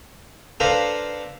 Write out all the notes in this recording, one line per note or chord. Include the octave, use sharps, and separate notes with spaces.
D4 A4 B4 C5 F5 A#5